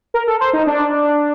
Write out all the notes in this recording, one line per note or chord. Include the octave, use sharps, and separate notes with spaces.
A#4
A4
C5
D#4
D4